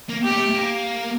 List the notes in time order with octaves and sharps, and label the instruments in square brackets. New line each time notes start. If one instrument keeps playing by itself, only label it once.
[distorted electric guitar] A#3
[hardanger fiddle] G4
[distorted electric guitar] A3
A#3